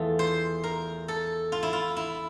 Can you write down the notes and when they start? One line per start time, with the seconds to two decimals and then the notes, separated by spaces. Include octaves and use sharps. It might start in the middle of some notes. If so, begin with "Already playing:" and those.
Already playing: E2 E3 A3 F4 A4
0.19 C5
0.64 A#4
1.08 A4
1.52 F4
1.63 E4
1.73 F4
1.97 E4